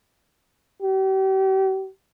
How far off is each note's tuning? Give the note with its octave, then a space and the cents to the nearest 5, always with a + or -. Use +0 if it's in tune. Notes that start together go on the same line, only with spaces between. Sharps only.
G4 -40